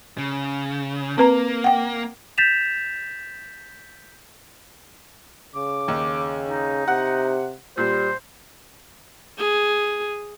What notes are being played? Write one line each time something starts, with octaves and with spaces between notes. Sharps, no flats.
C#3
A#3 C4 B4 A#5
F#5 G5
G6 A6 B6 E7 F7
C#3 D6
D#2
D#4
C3 F#5
A#2 G3 C5
G#4